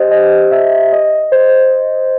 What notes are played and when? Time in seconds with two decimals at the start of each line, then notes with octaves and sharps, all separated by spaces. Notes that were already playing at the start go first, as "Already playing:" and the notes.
Already playing: G4 C5 D#5
0.11 D#5
0.51 E5
0.92 D#5
1.32 C5